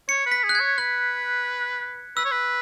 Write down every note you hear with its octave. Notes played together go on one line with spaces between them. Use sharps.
C#5 C#7
B4
B6
G#4
F#6
G#6
C#5
B4 F#6
B4 E6
C#5
B4